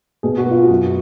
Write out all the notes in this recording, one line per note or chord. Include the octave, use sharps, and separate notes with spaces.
B2 G#4
F#4
B3 F4
F#4
F#2